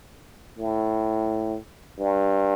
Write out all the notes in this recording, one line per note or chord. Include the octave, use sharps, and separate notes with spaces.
A2
G2